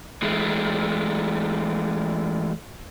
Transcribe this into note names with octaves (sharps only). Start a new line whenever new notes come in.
E3 G#3 A3